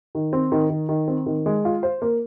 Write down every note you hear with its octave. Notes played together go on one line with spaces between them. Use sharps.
D#3
C4
D#3
D#3
D#3
C4
D#3
G#3
F4
C5
A#3